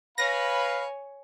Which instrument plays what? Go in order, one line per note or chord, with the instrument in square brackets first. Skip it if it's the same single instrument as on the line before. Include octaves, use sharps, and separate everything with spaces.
[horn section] B4 F5 B5 [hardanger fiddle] C#5 G#5 [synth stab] A#6